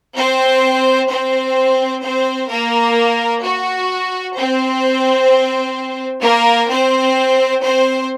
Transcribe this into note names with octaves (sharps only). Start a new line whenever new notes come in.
C4 C5
C4 C5
C4 C5
A#3 A#4
F#4
C4 C5
A#3 A#4
C4 C5
C4 C5